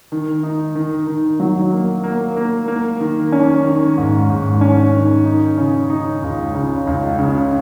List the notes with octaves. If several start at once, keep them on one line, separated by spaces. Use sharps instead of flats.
D#3
D#4
D#3
D#3
F#3
A#3
A#3
A#3
A#3
D#3
C#4
D#3
G#2
G#2
C#4
D#3
D#4
C#3
D#4
C#2
C#3
C#2
C#3